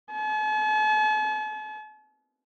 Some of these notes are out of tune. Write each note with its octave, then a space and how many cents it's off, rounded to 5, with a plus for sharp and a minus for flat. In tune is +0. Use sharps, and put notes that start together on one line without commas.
A5 -45